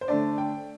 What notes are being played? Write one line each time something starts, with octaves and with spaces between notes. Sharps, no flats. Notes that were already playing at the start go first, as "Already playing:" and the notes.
C5
D3 A3 D4 D5
G5